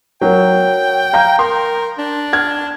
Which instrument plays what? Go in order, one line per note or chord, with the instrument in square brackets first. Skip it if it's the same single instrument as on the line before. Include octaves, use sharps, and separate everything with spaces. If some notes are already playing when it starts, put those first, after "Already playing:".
[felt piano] F#3 A#4 [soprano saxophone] G5
[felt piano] F5 A#5 G6
[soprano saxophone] A#4 [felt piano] C6
[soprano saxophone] D4
[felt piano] F6 G#6